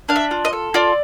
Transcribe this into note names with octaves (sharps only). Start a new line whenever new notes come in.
D4 F5
E5
F4
D#5
A4
F4 D5